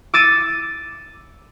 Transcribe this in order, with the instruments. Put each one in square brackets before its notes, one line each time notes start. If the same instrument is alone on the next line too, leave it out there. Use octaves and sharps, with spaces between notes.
[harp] D6 E6 A6 C#7 D#7